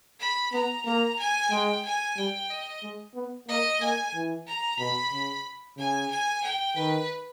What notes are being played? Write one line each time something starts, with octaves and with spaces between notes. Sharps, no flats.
B5
B3 A#5
A#3 A#5
G#5
G#3 G5
G#5
G3 G5
D#5
G#3
B3
A#3 D#5
A#3 G#5
E3
A#5
B2 B5
C#3
C#3 G#5
G#5
G5
D#3 B4